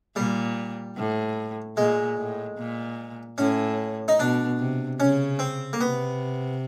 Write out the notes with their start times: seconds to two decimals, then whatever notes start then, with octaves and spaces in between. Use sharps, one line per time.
0.16 A#2 G3
0.97 A2
1.77 A#2 G#3
2.18 A2
2.58 A#2
3.38 A2 C#4
4.08 D#4
4.19 B2 D4
4.59 C3
5.00 C#3 C#4
5.39 C4
5.73 A#3
5.80 C3 B3